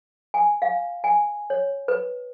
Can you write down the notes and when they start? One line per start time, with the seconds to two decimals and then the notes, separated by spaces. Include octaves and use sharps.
0.34 G#5
0.62 F5
1.04 G#5
1.50 C#5
1.88 B4